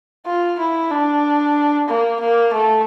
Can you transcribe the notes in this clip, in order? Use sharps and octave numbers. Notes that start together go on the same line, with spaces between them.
F4
E4
D4
A#3
A#3
A3